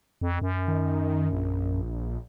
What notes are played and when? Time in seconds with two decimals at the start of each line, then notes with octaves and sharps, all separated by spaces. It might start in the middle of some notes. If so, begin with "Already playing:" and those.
0.21 F2
0.42 F#2
0.68 D#3
1.33 A#1